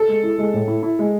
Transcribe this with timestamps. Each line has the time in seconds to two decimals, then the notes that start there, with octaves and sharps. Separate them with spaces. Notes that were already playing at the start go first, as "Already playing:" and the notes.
Already playing: A4
0.08 G#3
0.23 E4
0.38 G#3
0.54 A2
0.68 E4
0.83 E4
0.99 G#3